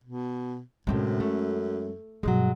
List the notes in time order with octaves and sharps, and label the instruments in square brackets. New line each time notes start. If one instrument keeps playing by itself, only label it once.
[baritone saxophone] B2
[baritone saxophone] F#2 [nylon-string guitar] A2 C3 [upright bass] G#3 C#4
[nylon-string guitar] A3
[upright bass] G2 B2 [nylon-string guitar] F#3 G#3